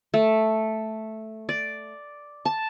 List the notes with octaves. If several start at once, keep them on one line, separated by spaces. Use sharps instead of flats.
A3
D5
A5